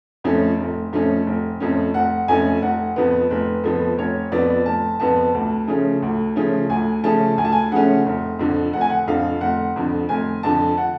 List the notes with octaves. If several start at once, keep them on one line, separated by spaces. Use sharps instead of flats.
F2 F3 A3 C#4
F1
F2 F3 A3 C#4
F1
F2 F3 A3 C#4
F1 F#5
F2 F3 A3 C#4 G#5
F1 F#5
F2 F3 B3
F1 B4
F2 F3 B3 A4
F1 C#5
F2 F3 B3 D5
F1 A5
F2 F3 B3 A5
D2
C#3 F3 A3 C#4
D2
C#3 F3 A3 C#4
D2 G#5
C#3 F3 A3 C#4 A5
D2 G#5
A5
G#5
C#3 F3 A3 C#4 F#5
F1
F2 D3 F3
F1 F#5
G#5
F#5
F2 D3 F3 F5
F1 F#5
F2 D3 F3
F1 G#5
F2 D3 F3 A5
F#5